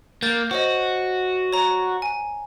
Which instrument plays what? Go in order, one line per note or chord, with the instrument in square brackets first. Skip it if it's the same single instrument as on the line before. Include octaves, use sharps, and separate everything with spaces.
[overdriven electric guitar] A#3 [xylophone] G6 A6
[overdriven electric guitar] F#4 [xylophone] C5 C#5 D#5
[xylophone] C#5 A#5
G#5